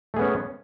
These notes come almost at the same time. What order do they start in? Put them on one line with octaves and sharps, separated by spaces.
A3 G#4 B3 C#4